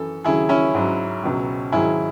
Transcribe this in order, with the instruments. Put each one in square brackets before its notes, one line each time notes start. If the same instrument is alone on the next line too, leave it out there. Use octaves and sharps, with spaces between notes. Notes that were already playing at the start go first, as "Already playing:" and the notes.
Already playing: [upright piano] F#2 E3 A4
D#2 C#3 F#3 E4 G#4
C#4 E4
G#2 F#3
C#2 B2 F#3
G#2 D#3 F#3 E4 G#4